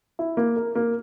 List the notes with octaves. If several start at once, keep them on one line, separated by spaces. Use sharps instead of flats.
E4
A#3
A#4
A#3